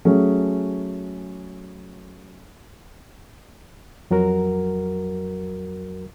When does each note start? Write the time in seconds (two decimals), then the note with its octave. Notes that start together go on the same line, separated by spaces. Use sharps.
0.05 F#3 A3 C#4 G#4
4.11 F2 F#3 F#4 A#4